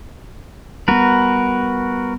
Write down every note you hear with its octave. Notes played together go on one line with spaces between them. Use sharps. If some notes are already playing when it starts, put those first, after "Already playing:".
G3 B3 F#4 A#4 B4